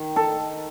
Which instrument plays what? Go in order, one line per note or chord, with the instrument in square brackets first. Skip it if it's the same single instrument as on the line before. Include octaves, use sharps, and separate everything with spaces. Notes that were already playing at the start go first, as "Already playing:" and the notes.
Already playing: [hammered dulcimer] D#3
A4